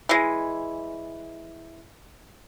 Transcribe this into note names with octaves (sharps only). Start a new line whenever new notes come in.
E3 G#3